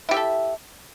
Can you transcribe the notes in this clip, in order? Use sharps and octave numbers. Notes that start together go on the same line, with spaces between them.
E4 G4 A4 E5